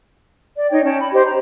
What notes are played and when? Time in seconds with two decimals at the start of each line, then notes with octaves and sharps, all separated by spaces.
0.55 D5
0.70 D#4 C#5 G5
0.85 C#4 G5 A5
1.00 B5
1.13 G4 C5 D#5
1.25 A#5